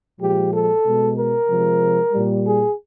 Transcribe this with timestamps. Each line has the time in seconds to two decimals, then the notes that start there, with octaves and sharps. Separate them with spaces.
0.21 A#2 F3 G#3 G4
0.53 A4
0.85 B2 G#3
1.17 A#4
1.49 C3 F3 G#3
2.12 A#2 G3
2.44 G#4